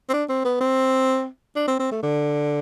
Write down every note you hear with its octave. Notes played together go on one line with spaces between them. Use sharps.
C4
D4
C4
B3
C4
D4
C4
C4
A3
D3